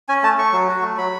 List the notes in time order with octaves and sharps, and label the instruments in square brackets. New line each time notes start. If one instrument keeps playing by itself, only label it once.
[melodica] C#4 G#5
A3 A5
A3 C#6
F#3
F#4
A3
F#3 B5